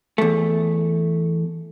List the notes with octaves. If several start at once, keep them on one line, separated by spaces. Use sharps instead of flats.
E2 A3